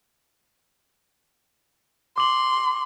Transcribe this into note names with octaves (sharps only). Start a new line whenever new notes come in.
C6 D6 F#7